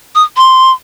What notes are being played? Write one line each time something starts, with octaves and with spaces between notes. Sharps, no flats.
D#6
C6